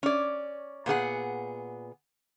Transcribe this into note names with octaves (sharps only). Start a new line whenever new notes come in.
C#4 D5
A#2 B3 G#4 F#5